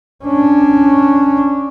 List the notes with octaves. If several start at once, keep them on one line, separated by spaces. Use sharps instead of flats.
C#4 D4